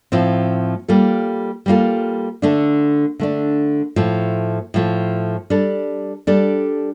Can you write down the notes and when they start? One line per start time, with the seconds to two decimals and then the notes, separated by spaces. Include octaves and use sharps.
0.12 A2 F3 C4
0.88 G3 A#3 F4 A4
1.66 G3 A#3 F4 A4
2.42 D3 A3 D4
3.20 D3 A3 D4
3.96 A2 F3 A3
4.74 A2 F3 A3
5.50 G3 D4 A4
6.27 G3 D4 A4